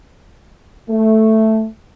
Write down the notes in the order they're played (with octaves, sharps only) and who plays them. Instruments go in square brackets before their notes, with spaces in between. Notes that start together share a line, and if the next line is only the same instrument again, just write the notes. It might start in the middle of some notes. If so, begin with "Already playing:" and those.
[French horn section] A3